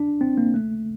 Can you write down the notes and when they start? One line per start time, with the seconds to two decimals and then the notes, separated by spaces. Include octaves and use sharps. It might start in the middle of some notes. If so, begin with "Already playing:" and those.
Already playing: D4
0.21 C4
0.38 A#3
0.54 A3